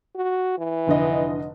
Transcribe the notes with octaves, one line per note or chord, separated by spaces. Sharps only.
F#4
E3
F1 D3 D#5